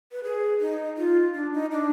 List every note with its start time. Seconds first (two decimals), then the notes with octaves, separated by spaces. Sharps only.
0.12 B4
0.24 G#4
0.60 D#4
0.98 F4
1.34 D4
1.53 D#4
1.72 D4